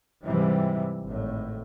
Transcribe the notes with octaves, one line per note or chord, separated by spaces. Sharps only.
G#2 C3 E3 G3
G#1 A2